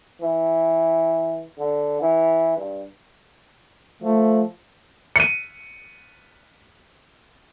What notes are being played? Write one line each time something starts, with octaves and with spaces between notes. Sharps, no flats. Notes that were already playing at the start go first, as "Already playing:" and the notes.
E3
D3
E3
G2
F3 A3
C#7 D#7